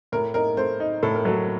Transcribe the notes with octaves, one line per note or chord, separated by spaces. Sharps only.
A2 A#4
D#4 A#4
A3 C5
D#4
A2 A4
A#4
F#3 A4